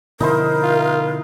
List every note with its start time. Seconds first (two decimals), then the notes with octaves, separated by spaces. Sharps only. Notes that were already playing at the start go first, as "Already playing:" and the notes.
0.20 B2 D3 F3 D#4 E4 A#4 C5
0.63 F4